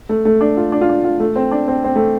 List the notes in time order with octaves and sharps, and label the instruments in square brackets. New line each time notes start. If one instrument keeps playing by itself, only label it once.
[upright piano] A3
A3
D4
F4
D4
F4
D4
F4
A3
C4
D4
C4
C4
A3